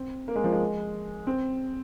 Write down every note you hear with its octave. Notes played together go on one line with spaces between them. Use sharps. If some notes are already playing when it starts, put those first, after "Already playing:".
Already playing: C4
A#3
G#3
F3
G#3
C4